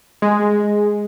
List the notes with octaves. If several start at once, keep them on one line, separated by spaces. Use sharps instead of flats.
G#3